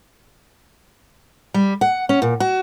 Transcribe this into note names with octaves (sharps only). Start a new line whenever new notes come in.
G3
F#5
C#4
A#2
F#4